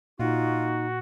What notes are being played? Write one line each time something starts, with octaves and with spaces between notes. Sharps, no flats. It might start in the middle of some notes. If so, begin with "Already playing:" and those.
A#2 D#4 F4 F#4